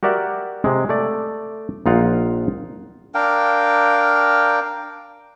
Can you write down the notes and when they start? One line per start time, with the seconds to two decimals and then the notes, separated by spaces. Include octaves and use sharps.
0.03 F#4 G4 A#4 D5 E5 F#5
0.64 C3 G#3
0.89 A3 D5
1.86 A#1 D#4 F4 F5 F#5
3.15 D4 A#4 F5 G5